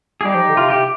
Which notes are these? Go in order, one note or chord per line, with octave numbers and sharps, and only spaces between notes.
G#4
G3 D#4 G4
F3
D3
C3 F4
C3 G4